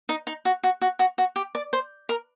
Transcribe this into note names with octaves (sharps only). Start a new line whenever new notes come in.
D#4
D#4
F#4
F#4
F#4
F#4
F#4
G4
D5
C5
A#4